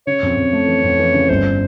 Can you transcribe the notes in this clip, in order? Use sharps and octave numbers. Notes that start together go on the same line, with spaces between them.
C#3 C#5
F2
F2
A3
E3
F2
E3
C#3
G1 C5